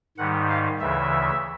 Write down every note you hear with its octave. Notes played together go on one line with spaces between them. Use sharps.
G#2 D#3 G3 F#5
F5
D2 C#3 E3 E5